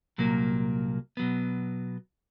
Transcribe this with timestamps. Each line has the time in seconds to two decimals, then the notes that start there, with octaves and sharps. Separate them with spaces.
0.18 C2 A#2 F#3 A#3
1.17 B2 F#3 B3